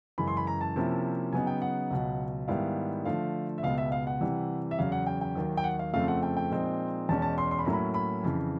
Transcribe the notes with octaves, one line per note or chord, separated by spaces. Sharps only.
F#2 C#3 E3 G#3 B5
C6
B5
A#5
A5
C3 F3 A#3 C#4 E4
C#3 F#3 B3 D#4 G#5
G5
F#5
C#2 B2 F#3
G#2 D#3 G3 B3 E4 F5
D3 F3 A3 F5
E5
C#2 B2 G#3 B3 F5
E5
F5
F#5
C3 E3 G3
E5
E2 C#3 F#3 F5
F#5
G5
G5
D#2 D#3 F#3
G5
F#5
F5
F2 C#3 F3 A3 C4 F5
F#5
G5
G5
A#2 F3 G#3 C4 D#4
E2 B2 G#3 C#4 A5
A5
C6
C6
B5
A2 F#3 A#3 C#4 E4 A#5
B5
B5
F2 C#3 E3